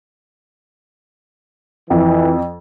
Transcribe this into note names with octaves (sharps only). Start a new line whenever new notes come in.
F2 E3